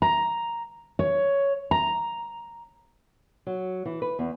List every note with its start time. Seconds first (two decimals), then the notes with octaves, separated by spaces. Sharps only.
0.02 A#5
0.99 C#5
1.71 A#5
3.47 F#3
3.85 E3
4.02 B4
4.19 E2